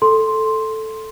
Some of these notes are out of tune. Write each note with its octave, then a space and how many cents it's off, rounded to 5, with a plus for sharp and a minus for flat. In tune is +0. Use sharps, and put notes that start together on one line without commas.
A4 +0 C6 +5